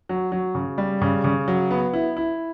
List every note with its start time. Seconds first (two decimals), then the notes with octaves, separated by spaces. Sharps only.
0.09 F#3
0.32 F#3
0.55 C#3
0.78 G3
1.02 C#3
1.24 C#3
1.48 F#3
1.71 B3
1.93 E4
2.17 E4